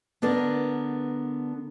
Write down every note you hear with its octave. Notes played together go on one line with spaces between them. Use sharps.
D3 B3 D4 A#4